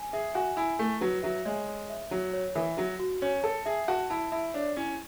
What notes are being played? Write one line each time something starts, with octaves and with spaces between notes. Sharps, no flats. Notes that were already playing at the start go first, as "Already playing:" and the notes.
Already playing: G#5
G#4 E5
F#4 G#5
E4 G#5
A3 E4
F#3 B4
F#3 E5
G#3 C#5
C#5
E5
F#3 C#5
C#5
E3 E5
F#3 F#4
F#4
C#4 C#5
A4 A5
G#4 E5
F#4 A5
E4 A5
E4 E5
D4 C#5
C#4 E4